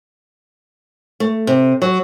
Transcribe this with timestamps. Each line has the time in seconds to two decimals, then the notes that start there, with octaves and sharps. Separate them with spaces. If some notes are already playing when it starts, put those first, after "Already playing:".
1.20 A3
1.47 C3
1.82 F#3